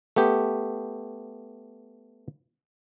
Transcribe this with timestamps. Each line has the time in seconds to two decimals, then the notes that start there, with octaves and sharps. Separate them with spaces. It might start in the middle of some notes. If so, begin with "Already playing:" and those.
0.16 A3 B3 G4